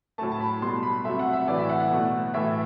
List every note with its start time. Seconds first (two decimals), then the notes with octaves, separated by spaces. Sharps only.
0.18 A2 F#3 A3 A5
0.32 A5
0.40 B5
0.62 B2 G3 C6
0.83 B5
1.05 C3 F#3 A3 E5
1.19 F#5
1.33 E5
1.48 A2 E3 A3 D5
1.59 E5
1.70 F#5
1.80 F#5
1.91 B2 F#3 A3
2.34 A2 E3 A3 E5